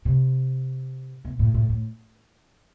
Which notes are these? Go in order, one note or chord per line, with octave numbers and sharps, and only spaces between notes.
C3
B2
A2
A2
A2